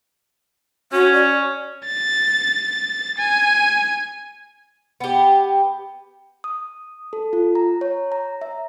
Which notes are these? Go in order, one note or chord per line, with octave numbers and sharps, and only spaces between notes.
C#4 F#4
D5
A6
G#5
B3 G4
D#6
A4
F4
A#5
C#5
A#5
E5